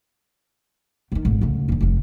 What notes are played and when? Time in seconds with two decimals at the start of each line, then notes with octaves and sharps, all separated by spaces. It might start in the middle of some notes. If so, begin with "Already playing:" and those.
1.12 C3 D#3
1.25 G#1 A2
1.41 D2 C#3
1.68 D#1 D3
1.81 F1 F3